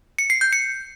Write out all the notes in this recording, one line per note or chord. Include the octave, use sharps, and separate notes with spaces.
C#7
C7
G6
C#7